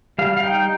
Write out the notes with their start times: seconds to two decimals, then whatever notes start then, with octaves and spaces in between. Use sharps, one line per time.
0.19 G3 F5
0.37 F5
0.44 D#4 G5